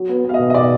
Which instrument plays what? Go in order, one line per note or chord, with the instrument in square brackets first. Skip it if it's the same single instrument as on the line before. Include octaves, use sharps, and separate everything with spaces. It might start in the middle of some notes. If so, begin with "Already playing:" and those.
Already playing: [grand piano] F#3
B3
[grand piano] B3 [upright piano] F5
[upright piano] D#5
[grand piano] B2
[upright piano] D#5
[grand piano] B2 [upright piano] D5